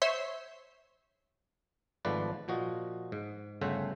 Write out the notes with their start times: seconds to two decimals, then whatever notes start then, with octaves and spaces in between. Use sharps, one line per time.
0.02 C5 C#5 E5 C6
2.05 G#1 G#2 F3 A3 B4 D5
2.48 A#2 F3 F#4 D#5
3.12 G#2
3.61 G1 C#3 A3 C5 E5 F#5